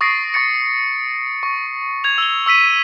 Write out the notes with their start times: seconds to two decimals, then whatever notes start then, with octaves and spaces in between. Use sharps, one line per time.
0.01 C#6 D#6 A6 A#6 C7 D7
0.34 C#6 A6 C#7
1.43 C#6
2.04 G#6 F7
2.18 E6 G7
2.46 C#6 E6 B6 D#7